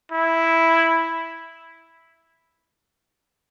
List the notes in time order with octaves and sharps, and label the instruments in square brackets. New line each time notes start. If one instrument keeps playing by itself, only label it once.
[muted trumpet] E4